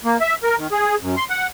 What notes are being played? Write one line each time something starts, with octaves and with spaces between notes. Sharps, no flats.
A#3
E5
A#4
D#3
G#4
F#2
C6
F#5